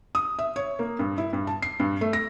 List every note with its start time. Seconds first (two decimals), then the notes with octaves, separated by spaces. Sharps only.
0.15 D#6
0.39 E5
0.56 C#5
0.79 A#3
0.99 G2
1.18 E4
1.33 G2
1.47 A5
1.62 C7
1.80 G2
2.01 A3
2.13 A#6